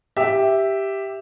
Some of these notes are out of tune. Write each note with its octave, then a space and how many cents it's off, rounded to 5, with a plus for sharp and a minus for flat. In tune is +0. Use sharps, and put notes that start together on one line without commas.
G4 +0 E5 +0